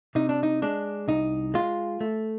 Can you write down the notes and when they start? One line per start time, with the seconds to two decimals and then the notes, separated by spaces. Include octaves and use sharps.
0.15 C3 D#4
0.29 D4
0.43 D#4
0.62 G#3 D4
1.08 C2 D#4
1.54 G#3 F4
2.01 A3